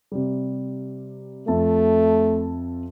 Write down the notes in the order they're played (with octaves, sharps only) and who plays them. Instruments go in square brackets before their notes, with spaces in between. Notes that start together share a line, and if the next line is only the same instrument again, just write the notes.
[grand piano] C3 G3
[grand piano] F2 E5 A5 [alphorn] A3